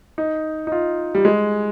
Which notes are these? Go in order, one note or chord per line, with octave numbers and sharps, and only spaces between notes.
D#4
D#4
F4
G3
G#3